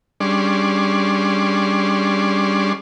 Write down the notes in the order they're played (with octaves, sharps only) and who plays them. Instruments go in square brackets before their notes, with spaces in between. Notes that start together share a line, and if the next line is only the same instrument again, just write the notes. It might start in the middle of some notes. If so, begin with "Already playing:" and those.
[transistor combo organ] G3 C#4 D4 G#4 D5 C6